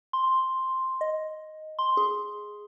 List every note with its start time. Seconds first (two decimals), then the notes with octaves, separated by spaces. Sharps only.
0.13 C6
1.01 D#5
1.79 C6
1.97 G#4